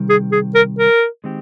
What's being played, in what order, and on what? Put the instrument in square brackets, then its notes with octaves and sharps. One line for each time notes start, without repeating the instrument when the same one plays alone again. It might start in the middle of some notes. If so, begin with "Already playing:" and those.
Already playing: [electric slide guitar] C3 D#3 G3
[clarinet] G#4
G#4
A#4
A#4
[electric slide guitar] D#3 G#3 C4 G4